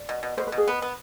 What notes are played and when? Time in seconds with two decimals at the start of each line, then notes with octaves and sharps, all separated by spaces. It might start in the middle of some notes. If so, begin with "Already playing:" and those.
Already playing: D5
0.09 B2
0.23 B2
0.37 B2 C5
0.47 B4
0.52 B2
0.57 G#4
0.67 B3 B4
0.82 B3